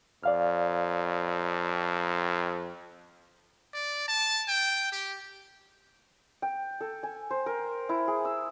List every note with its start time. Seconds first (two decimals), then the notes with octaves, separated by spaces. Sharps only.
0.23 F2 D5 F5 F6
3.74 D5
4.08 A5
4.48 G5
4.93 G4
6.42 G5
6.81 A4
7.03 G#5
7.31 C5
7.46 A#4
7.89 E4
8.08 G#4
8.25 E6